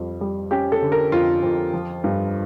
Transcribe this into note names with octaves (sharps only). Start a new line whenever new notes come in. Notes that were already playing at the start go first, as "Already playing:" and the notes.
Already playing: F2 G3
G3
C#4 G4
A4
D3
A#4
F2 F4
F2
F3
G2